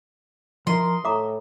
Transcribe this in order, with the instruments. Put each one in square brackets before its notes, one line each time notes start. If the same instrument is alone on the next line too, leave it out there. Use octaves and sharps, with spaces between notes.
[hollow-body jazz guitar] F3 E4 [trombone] A#4 [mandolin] D#5 C6
[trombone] A2 [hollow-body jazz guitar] E5 [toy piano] A#5 D6 D#6